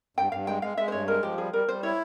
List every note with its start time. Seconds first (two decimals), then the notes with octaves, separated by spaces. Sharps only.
0.17 G2 G5
0.32 G2 F5
0.47 G#3 G5
0.62 G#3 F5
0.77 G#3 E5
0.88 C5
0.92 G2 C#5
1.08 G#3 A#4
1.23 F3 G4
1.38 G3 G#4
1.53 G3 A#4
1.68 G3 C5
1.83 E4 C#5